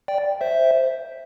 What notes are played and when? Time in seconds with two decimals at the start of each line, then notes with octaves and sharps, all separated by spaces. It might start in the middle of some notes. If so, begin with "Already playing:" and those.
0.08 D5 G5
0.41 C5 E5